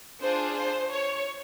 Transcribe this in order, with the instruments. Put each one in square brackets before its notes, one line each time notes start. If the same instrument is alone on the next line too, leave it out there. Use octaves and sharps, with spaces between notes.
[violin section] D4 F4 G#4 C5
C5
C#5